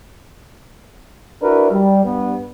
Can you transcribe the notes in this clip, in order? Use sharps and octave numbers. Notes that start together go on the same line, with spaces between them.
D4 E4 F#4 A#4 B4
G3
G2 B3